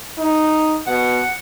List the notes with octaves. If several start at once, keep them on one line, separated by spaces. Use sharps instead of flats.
D#4
B2 F#5